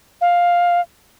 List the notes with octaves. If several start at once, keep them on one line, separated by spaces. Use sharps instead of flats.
F5